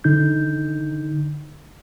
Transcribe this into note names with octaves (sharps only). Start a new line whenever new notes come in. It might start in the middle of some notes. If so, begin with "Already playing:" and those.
D3 D#4 G6